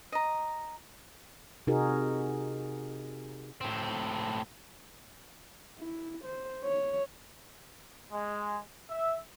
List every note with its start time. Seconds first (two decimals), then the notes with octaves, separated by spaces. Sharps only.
0.12 D#5 A#5
1.67 C3 D#4 F#4 G#4 A#4
3.61 A2 C4
5.79 E4
6.25 C5
6.65 C#5
8.13 G#3
8.90 E5